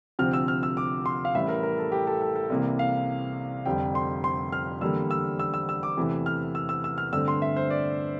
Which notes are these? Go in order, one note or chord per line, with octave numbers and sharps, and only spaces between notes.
D2 C3 F3 C4 F6
E6
F6
E6
D6
C6
F5
A1 A2 G3 E5
A#4
A#4
A4
G4
A4
A4
A4
C2 C3 E3 A#3
F5
F1 F2 D3 G3 G5
C6
C6
F6
E2 D3 G3 A#3 E6
E6
E6
E6
E6
D6
E2 C3 E3 A3
F6
E6
E6
E6
F6
G1 G2 D3 A3 C4 E6
C6
E5
C5
D5